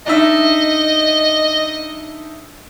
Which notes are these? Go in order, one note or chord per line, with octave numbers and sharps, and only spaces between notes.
D4 D#4 D#5 E5